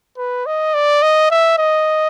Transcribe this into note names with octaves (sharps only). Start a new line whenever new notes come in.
B4
D#5
D5
D#5
E5
D#5